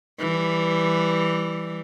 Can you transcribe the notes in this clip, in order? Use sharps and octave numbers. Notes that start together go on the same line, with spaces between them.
E3 G3